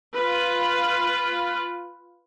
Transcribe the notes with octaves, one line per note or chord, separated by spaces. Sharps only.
F4 B4